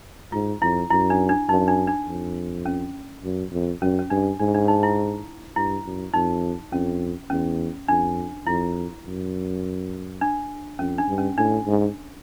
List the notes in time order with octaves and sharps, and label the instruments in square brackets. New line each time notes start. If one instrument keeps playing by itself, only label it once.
[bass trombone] G#2 [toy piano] F4
[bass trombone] F2 [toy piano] E4
[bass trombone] F#2 [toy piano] E4
[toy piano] D4
D4
[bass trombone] F#2 [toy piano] D#4
[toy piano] D4
D4
[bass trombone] F2
[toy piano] C#4
[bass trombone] F#2
F2
[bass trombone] F#2 [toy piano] C#4
[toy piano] C#4
[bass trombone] G2 [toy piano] D4
[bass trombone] G#2 [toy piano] D4
[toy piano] D4
D#4
E4
[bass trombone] G2 [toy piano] E4
[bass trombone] F#2
[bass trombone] F2 [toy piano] D#4
[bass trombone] F2 [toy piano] C#4
[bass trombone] E2 [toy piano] C#4
[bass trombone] F2 [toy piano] D4
[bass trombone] F2 [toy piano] E4
[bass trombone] F#2
[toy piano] D4
[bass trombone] F2 [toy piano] C#4
[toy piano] D4
[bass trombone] G2
[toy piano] C#4
[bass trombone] A2 [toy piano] D4
[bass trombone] G#2